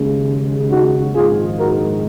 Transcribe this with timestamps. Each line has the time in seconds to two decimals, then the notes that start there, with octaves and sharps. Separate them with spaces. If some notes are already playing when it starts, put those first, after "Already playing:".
Already playing: D#2 C#3 G#3
0.71 D#4 F#4
1.14 A#1 G#2 D#3 G#3 C4 F4 G#4
1.57 F#4 A#4